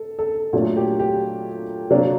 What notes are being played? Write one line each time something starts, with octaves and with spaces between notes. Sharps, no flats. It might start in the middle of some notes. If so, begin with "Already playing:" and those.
Already playing: A4
A4
A#2 F#3 A3 D4
G4
G4
C3 F#3 A#3 D4